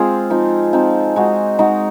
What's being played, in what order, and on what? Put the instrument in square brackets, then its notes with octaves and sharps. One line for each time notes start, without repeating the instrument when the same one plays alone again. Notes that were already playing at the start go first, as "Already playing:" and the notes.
Already playing: [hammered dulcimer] G#3 C4 F4 G#4
F3 C4 D#4
F3 C4 D#4
G#3 D#4 F#4
G#3 D#4 F#4